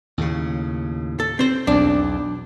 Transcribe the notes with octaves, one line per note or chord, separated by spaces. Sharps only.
D#2 A2 C#3
A4
C4 C5
B1 E2 D4